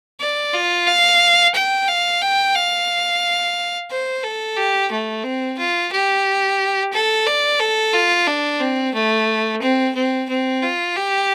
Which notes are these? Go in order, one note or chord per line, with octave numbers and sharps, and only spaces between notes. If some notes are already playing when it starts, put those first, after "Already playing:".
D5
F4
F5
G5
F5
G5
F5
C5
A4
G4
A3
C4
F4
G4
A4
D5
A4
F4
D4
C4
A3
C4
C4
C4
F4
G4